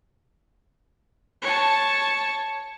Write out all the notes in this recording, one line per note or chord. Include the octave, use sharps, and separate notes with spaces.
C#5 A5